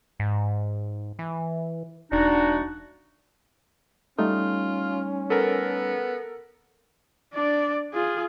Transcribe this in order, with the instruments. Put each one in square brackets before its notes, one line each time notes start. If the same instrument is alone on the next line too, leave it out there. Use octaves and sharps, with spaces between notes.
[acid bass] G#2
E3
[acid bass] E1 [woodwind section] D4 D#4 F#4
[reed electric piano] G3 A3 D#4 [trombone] C#4 [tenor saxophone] F4
[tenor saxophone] B3 [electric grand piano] A4 A#4
[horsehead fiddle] D4 D5
F4 G#4